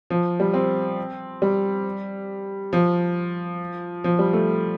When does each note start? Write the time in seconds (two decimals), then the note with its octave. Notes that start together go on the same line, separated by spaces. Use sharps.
0.10 F3
0.40 G3
0.54 C4
1.42 G3
2.73 F3
4.04 F3
4.19 G3
4.33 A3